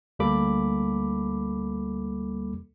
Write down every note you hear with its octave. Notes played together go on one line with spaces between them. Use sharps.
D2 G3 A#3 A4 B5 D6